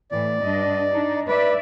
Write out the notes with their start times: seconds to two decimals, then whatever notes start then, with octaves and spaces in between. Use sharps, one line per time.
0.12 A2 E3 D5
0.43 G2 D4 D#5
0.92 D4 D#4
1.28 B4 D5 E5